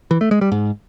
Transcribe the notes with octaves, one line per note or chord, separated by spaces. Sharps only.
E3
A3
G#3
G3
G#2